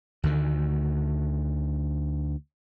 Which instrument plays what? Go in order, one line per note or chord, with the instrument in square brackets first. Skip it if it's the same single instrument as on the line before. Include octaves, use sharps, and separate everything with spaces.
[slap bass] D2 D3 D#3